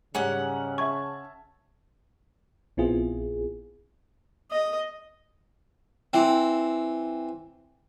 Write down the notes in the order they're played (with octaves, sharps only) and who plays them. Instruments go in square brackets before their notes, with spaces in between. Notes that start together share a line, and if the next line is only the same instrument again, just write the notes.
[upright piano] G#2 G3 [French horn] C#3 [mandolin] C#4 F#5 [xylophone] G#5
[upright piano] E5 A5 G#6 [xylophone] C#6
[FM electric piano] A#1 B3 C4 E4 F4 G#4
[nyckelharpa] D#5
[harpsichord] E3 C4